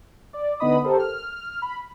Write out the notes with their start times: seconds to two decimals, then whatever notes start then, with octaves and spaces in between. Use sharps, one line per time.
0.33 D5
0.60 D3 B3 D#4 D#5 B5 D#6
0.84 G4 A4 A#4 C5
0.99 F6
1.62 B5